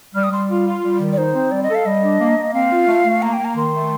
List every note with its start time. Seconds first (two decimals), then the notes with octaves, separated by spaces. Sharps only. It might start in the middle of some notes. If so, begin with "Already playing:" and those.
0.15 G3 F6
0.24 D#6
0.32 G3 C6
0.50 F4
0.67 F4
0.83 G3
1.00 D#3
1.13 D5
1.18 D#4 C5
1.34 C4
1.51 G3 D5
1.63 D#5
1.69 A4
1.75 F5
1.86 G3 D#5
2.02 D4
2.20 A#3
2.36 A#3
2.54 C4 F5
2.72 F4
2.88 A3
3.05 A3
3.22 A#3 A#5
3.33 G5
3.39 A#3
3.45 A#5
3.56 D#3 C6
3.74 A3